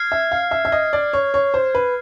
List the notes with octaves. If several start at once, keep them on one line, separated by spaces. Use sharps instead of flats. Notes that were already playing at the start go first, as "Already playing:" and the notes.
Already playing: F6 G#6 C7
E5
F5
E5
E5
D#5
D5
C#5
C#5
C5
B4